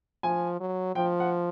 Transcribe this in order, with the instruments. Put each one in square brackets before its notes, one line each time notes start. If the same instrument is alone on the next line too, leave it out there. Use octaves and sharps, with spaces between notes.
[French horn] F3 [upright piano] G#5
[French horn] F#3
[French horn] F3 [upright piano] G5
[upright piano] F#5